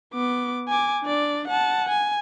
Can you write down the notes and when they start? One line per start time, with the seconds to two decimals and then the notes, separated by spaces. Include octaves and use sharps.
0.14 B3 D6
0.68 G#5 D6
1.03 D4 D5
1.48 F#5 A5
1.88 G#5